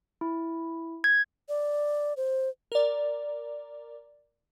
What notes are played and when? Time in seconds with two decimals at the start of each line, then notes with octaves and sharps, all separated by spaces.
0.21 E4
1.04 G#6
1.49 D5
2.17 C5
2.72 A#4 D5